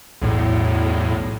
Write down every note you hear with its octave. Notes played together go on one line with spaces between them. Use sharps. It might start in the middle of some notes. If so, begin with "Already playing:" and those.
B1 E2 A2